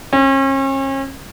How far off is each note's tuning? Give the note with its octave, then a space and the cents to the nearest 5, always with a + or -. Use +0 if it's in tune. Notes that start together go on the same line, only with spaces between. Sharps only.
C#4 -40